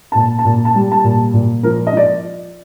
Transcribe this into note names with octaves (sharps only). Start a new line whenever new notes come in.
A#2 A5
A5
A#2
A5
G3
A5
A#2
A#2
F3 A#4
D#5
F3 D5